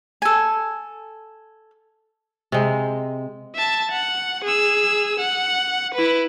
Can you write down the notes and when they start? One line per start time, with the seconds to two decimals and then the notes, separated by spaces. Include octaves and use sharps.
0.22 A4 G#5
2.52 C3 G#3
3.56 E5 A5
3.91 F#5
4.44 G#4 E6
5.20 F#5
5.94 E4 B4